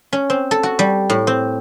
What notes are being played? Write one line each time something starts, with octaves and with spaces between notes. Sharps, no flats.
C#4
C4
A4
F#4
G3
A2
C4